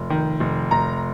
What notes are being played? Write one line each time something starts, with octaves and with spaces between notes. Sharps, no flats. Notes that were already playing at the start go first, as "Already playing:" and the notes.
Already playing: F1
D#3
F1
F1 A#5